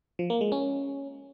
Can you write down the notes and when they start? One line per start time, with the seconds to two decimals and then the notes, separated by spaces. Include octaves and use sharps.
0.19 F3
0.30 A#3
0.41 G#3
0.52 C#4